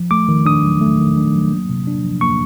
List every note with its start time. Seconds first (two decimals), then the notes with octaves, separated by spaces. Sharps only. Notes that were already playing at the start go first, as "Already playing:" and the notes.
Already playing: F3
0.11 A3 D6
0.28 D#3
0.46 D4 D#6
0.63 F#3
0.81 A3
0.99 D#3
1.16 D4
1.33 F#3
1.52 A#3
1.69 C3
1.87 D4
2.04 F3
2.21 A#3 C#6